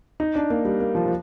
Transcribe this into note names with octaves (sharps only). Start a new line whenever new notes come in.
D#4
D4
A#3
G3
A#3
F3
F3